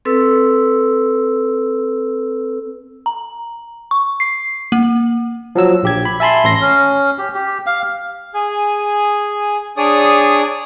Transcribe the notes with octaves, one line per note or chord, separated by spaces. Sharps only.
C4 A4 B4 E6
A#5
C#6
C7
A#3
F3 F#3 E6
A#1 G4 G#6
B5
E5 G#5 A5 B5 C6
A1 C6 A#6
C#4
G4
G4
F5
G#4 G#5
D4 G#4 C#5 D5 D#6